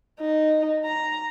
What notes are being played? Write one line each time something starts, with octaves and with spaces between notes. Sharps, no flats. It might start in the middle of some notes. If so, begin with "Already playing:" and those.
D#4
A#5